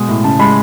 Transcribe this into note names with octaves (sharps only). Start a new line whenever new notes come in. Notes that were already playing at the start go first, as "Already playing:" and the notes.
Already playing: B2 G#3 D#6
A2
C#3 A5
G#3 B5